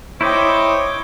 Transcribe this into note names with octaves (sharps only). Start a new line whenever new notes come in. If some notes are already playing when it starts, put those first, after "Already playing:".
E4 C5 C#5 D#5 G5 D6